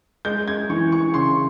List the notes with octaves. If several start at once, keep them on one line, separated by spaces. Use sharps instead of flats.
G#3 G6
G#6
E3 C#6
C#6
C#3 C6